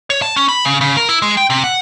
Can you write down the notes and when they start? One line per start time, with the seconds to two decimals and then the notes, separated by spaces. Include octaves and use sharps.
0.10 C#5
0.22 A5
0.36 C#4
0.49 B5
0.65 C#3
0.81 C#3
0.97 A#4
1.09 E4
1.22 G#3
1.37 G5
1.50 C3
1.64 F#5